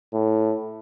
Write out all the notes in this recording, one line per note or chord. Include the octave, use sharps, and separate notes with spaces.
A2